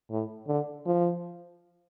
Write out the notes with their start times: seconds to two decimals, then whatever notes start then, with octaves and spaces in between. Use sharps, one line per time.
0.11 A2
0.48 D3
0.86 F3